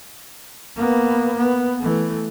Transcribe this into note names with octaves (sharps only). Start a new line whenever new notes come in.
A#3 B3
B3
E3 A3